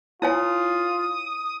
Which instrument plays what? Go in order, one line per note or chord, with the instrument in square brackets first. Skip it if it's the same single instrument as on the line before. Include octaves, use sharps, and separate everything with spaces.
[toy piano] E4 C#5 G#5 [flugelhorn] F4 [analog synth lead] D#6